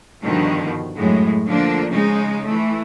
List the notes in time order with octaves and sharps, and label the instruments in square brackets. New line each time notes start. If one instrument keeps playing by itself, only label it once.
[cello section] G2 B2 D3 D#3 F3
F#2 A2 G#3
D3 F3 A#3 D4
C#3 G#3 D#4
E3 A3